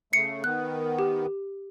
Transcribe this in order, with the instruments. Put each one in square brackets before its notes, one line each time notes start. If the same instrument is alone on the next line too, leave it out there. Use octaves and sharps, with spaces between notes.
[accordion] C#3 A3 [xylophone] C7 C#7
[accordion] D#3 B3 [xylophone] F#6
[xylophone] G4